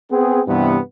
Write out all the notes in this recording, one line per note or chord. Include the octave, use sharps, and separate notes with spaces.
B3 C4 G#4
G2 C3 E3 B3